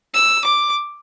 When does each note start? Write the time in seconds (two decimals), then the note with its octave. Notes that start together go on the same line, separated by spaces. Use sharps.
0.14 E6
0.45 D6